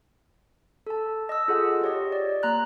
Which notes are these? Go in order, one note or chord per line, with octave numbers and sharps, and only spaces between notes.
A4 A5
D#5 E6
F4 G#4 A4 F#5
G4 C#5 D#5
D5
A#3 A#5 F#6